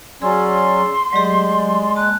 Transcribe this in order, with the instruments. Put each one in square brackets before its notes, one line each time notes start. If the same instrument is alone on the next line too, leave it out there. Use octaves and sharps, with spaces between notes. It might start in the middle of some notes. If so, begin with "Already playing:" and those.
[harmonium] F#3 C#4 [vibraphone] G#4 E6 [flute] D5 [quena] C6
[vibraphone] F#3 A3 G4 [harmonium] G#3 [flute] D5
[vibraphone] A#3 A5 [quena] F#6